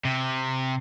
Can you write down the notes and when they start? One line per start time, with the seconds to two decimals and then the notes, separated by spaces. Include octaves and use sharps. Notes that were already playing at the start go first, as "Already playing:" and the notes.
0.05 C3